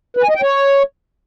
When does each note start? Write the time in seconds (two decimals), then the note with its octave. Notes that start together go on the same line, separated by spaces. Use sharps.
0.17 B4
0.23 G#5
0.29 D#5
0.36 G5
0.42 C#5